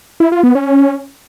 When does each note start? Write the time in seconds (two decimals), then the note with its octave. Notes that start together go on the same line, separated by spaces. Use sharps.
0.20 E4
0.32 F4
0.43 B3
0.55 C#4